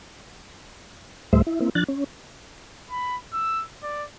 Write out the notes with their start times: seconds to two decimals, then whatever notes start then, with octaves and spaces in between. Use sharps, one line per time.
1.33 D2 A2 G3 A3 C5 E5
1.47 E4
1.60 A#3 C4 E4
1.75 F3 D4 F#6 A6
1.88 C#4
2.91 B5
3.33 E6
3.83 D5